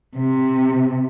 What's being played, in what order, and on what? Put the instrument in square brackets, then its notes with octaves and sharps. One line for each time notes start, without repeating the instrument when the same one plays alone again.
[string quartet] C3